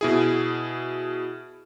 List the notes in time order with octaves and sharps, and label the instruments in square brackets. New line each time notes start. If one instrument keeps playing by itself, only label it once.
[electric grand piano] B2 E4 G#4